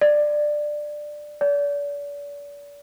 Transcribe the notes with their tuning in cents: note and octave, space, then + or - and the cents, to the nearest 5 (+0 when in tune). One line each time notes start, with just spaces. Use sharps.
D5 +15
D5 -40